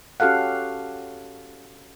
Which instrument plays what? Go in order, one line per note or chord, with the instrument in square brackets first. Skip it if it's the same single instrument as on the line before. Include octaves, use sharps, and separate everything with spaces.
[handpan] C#4 F#4 G4 A4 F5 F#5